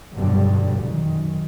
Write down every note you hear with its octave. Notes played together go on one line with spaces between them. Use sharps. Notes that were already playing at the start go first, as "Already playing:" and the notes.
F1 G2 B2 D3 F#3 G3
F#2 D#3